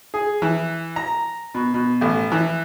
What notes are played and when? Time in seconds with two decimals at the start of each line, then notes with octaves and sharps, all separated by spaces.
0.14 G#4
0.42 E3
0.96 A#5
1.55 B2
1.74 B2
2.01 A1
2.32 E3